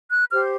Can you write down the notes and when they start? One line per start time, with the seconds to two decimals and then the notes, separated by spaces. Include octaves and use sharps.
0.10 F#6
0.30 G4 C5 F6